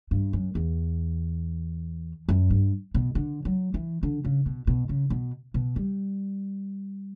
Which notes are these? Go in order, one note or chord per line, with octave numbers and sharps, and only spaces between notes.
G2
F#2
E2
F#2
G2
B2
D3
F#3
E3
D3
C#3
B2
B2
C#3
B2
B2
G3